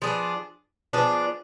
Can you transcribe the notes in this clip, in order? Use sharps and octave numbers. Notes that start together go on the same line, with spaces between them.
F3 B3 D4 G#4
F3 B3 D4 G#4